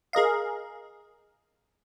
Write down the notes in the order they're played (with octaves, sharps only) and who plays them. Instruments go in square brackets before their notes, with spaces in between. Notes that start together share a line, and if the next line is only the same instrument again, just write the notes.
[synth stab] G#4 A#4 D#5 F5